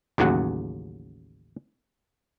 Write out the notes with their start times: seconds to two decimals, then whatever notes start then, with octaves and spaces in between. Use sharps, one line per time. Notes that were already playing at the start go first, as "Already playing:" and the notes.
0.18 A1 D#2 C#3 F#3 F#5